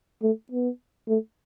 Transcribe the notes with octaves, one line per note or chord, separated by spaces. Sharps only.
A3
B3
A3